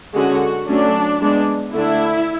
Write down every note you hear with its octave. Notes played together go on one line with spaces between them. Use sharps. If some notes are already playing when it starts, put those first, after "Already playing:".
D3 G#3 C#4 F#4
F#3 A3 C#4 D4
G#3 B3 D4
D3 A3 D4 E4